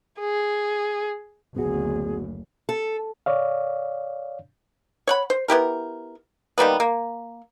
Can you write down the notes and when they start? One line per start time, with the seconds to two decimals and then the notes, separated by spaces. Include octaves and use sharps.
0.19 G#4
1.56 F#1 D2 B3 F#4 G#4
2.69 A4
3.26 C#5 D5 F5
5.07 C#5 F#5 B5
5.30 C5
5.48 B3 E4 G4 A#4
6.58 D#3 G3 A#3 B3
6.80 A#3